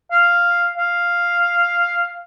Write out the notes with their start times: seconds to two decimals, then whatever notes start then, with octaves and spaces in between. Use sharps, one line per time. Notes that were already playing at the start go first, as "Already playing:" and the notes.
0.11 F5
0.78 F5